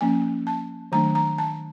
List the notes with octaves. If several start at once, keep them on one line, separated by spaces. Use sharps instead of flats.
F3 A#3 C#4 G#5
A5
D#3 F#3 A3 D4 A#5
A#5
A5